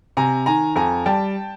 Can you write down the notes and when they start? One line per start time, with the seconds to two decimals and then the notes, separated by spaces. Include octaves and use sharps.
0.17 C3 G#5 A#5
0.46 D#3 G#5 A#5
0.76 F2 G#5 A#5
1.06 G3 G5 A5